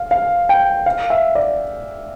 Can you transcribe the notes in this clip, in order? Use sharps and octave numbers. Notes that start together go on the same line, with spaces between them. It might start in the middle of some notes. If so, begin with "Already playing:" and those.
Already playing: F5
F5
G5
F5
E5
D5